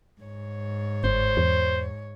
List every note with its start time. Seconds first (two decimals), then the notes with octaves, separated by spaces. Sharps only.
0.21 G#2 C#5
1.04 G1 C5
1.37 E2